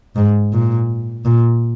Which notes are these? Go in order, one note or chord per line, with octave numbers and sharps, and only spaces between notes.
G#2
A#2
A#2